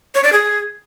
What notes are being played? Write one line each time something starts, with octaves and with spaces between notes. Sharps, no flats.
C#5
D5
G#4